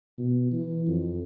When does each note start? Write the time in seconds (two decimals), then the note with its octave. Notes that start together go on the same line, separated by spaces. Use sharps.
0.18 B2
0.52 E3
0.87 F2